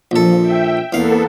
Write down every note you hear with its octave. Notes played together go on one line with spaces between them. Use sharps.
A#1 F3 A4
E5 G5
E2 A#3 B3 A4 F5